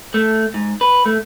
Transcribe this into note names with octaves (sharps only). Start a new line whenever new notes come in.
A3
G#2
B4
A3